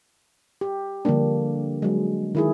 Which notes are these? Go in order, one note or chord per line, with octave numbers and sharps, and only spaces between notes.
G4
D3 F3 G3 A#3 D4
F#3 G#3
D#3 E4 G#4